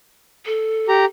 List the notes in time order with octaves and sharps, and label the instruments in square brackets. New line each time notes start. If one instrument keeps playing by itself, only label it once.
[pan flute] A4
[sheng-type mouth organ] G4 A#5